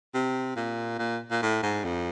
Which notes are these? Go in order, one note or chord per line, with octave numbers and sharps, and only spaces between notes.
C3
A#2
A#2
A#2
A2
G#2
F2